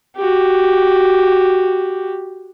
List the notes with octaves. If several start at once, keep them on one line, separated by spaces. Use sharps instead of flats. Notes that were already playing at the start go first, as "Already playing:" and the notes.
F#4 G4